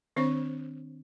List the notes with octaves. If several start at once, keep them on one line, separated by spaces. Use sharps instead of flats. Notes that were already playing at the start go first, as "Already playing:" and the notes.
D#3 C4 D4 C5 C#5 C#6